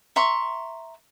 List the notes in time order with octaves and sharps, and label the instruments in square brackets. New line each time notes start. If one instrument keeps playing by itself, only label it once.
[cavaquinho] E5 A#5 C6 C#6